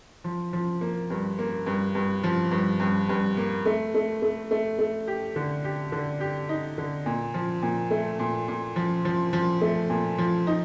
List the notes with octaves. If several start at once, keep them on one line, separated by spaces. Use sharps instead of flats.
F3
F3
A#3
G2
A#3
G2
G2
F3
G2
G2
G2
A#3
A3
A3
A3
A3
A3
G4
D3
G4
D3
G4
D#4
D3
A#2
F3
A#2
A3
A#2
A#2
F3
F3
F3
A3
A#2
F3
D#4